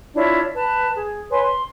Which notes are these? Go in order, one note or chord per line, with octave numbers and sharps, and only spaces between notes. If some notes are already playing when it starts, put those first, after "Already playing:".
D4 E4 F4 C#5
B4 A5
G#4
B4 C#5 G#5 C6
C6